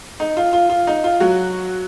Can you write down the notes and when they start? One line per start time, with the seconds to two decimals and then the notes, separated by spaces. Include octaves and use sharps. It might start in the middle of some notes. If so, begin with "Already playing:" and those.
0.20 D#4
0.37 F4
0.53 F4
0.70 F4
0.87 D#4
1.04 F4
1.20 F#3 F#4